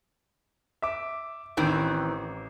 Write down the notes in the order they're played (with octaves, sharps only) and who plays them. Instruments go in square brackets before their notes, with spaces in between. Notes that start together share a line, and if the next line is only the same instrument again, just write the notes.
[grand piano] E5 D6
[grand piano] A1 [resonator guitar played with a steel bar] D#3 E3 C4